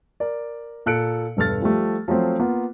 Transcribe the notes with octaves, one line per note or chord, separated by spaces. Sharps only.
A#4 D5
A#2 A4 F#6 C#7 D7
E1 G2 A4 B4 F6 A6
F3 G3 A3
F3 F#3 A3 C4
A#3 B3 F4